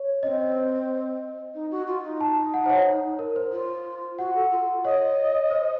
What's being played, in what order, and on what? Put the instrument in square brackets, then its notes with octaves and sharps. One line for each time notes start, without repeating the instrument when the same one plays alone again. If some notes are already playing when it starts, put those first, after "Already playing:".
Already playing: [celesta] C#5
[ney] C#4 [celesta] D#5
[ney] C4
D#4
F#4
F4
D#4
[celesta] A5
F#5
C5
C#5
A#4
C5
[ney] F4
[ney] F#4 [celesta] F#5
[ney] A4
F4
[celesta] C#5 [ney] D#5
[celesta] C5